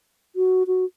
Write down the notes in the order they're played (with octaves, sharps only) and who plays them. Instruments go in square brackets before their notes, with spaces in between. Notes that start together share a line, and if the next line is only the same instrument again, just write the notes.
[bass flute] F#4
F#4